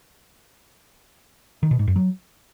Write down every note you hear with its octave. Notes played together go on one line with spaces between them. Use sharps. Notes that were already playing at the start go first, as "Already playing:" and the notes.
D#3
B2
G#2
F#2
F#3